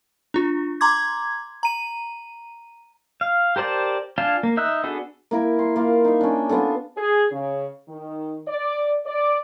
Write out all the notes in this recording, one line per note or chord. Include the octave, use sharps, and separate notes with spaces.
D4 F4
A#5 C6 D6 G#6
A#5 D#7
F5
G4 A#4 C5 D5 A5
D4 F4 F5 G#5 A5
A#3
D#4 E5 E6 F#6
B3 D4 F#4 G#4 A4
A#3 E4 A#4
C6
A#3 F4
D#4 E5
C#4 D4
B3 D4 F4 A4
G#4
C#3
D#3
D5
D5